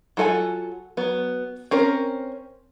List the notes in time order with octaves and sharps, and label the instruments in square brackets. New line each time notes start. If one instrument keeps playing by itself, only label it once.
[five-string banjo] F#3 F4 A4 F#5 G#5
F#3 B3
C4 C#4 A#4